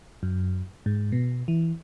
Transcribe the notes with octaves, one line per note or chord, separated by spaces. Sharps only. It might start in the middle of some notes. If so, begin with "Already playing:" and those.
F#2
G#2
B2
E3